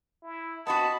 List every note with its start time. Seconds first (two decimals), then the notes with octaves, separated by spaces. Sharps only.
0.22 E4
0.67 B3 C4 F#4 D#5 A5 B5 D#6